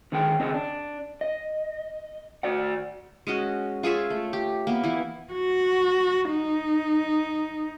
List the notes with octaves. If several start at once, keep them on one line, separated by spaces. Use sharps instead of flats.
D3 D#3 G#4 A#4 G5
C#3 C4 G#4 D#5
D4
D#5
F#4 D5 F#5
G#3 C#4 F#4 D#5
F4 G#4 C#5 E5
A3
G4
A#3 B3
E3 E4
F#4
D#4